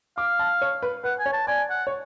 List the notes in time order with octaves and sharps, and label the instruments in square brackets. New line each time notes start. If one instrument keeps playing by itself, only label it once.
[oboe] F5 [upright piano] D6
[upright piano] A5
C#5
B4
[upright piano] B4 [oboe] F#5
[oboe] G#5
[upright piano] C#5
[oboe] A5
[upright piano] D5 [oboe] G#5
[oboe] F#5
[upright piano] C#5